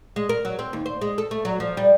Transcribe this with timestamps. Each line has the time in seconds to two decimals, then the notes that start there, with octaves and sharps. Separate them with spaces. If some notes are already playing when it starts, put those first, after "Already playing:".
0.16 G#3
0.29 A#4
0.45 F#3
0.59 C4
0.73 D#2
0.86 C5
1.01 G#3
1.18 A4
1.31 A3
1.45 F#3
1.60 F3
1.77 G3